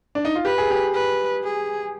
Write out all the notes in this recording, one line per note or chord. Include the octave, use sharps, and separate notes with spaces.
D4
D#4
F4
G4 B4
G#4
G4
B4
G#4